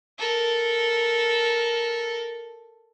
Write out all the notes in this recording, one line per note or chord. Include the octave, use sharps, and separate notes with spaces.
A4 A#4